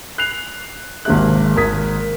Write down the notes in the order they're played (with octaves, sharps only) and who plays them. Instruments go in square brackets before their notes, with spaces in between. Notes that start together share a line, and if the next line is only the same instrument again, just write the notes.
[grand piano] F#6 C7 F7
G#1 C3 A#3 G#4 E5 F#6
G#1 A#4 D#6 G#6 B6